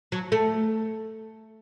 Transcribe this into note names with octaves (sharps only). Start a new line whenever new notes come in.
F#3
A3